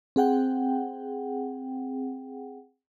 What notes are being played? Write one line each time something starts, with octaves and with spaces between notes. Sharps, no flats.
C4 G#4 F#5 G5